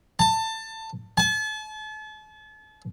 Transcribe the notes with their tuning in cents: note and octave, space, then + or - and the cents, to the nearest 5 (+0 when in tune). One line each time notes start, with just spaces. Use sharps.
A5 +20
A5 -40